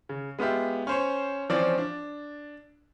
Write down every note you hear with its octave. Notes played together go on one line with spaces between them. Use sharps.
C#3
G#3 B3 F4 G4 E5
C#4 C5 C#5
E3 F3 C4 C#4 D5
D4